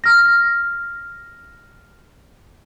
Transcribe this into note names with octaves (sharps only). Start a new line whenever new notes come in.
F6 A#6